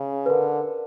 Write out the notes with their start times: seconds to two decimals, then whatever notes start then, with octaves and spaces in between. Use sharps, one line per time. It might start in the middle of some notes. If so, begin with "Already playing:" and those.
Already playing: C#3
0.26 B4
0.30 D3 A#4